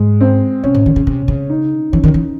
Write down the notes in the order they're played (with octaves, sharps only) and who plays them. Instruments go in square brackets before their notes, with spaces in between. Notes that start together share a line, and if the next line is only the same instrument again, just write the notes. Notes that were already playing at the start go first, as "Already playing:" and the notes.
Already playing: [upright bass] G#2 [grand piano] G#3
[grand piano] C4
[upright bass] C3 [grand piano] C#4
[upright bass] A2
D#3
C#3
C3
C#3
[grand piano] D#4
[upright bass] E3 [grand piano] C#4
[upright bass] D#3
E3